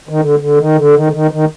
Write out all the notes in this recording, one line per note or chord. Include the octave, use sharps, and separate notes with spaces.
D#3
D3
D3
D#3
D3
D#3
D3
D#3
D#3